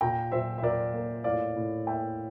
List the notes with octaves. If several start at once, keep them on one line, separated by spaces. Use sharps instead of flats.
A#2 G5 A#5
A#2 C5 E5
E5
A#2 A#4 D5
A#3
A2 D5 F5
A2
A#3 E5 G5